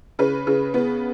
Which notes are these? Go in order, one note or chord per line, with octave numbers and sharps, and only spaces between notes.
C#3 B4
C#3
B3